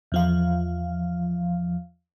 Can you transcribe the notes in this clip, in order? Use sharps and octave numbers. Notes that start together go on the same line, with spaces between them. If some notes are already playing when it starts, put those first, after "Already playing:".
E2 F3 F5